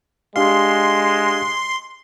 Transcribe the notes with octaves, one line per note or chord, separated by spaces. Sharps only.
G#3 D4 G4 F5 C6